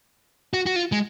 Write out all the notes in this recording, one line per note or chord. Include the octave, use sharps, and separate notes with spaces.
F#4
F#4
F4
G#3